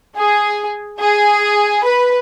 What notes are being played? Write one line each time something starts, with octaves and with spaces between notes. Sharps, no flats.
G#4
G#4
B4